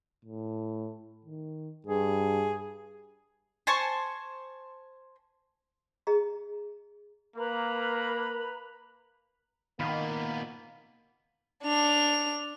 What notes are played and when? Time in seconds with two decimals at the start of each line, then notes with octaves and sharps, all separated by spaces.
0.25 A2
1.25 D#3
1.87 G2 G#4
3.67 C5 G#5 A5 C#6
6.07 G#4 D#5 A#5
7.36 A#3 A#4 B4 A#5 B5
9.80 A#2 D#3 A#3 B3 F5 B5
11.64 D4 F7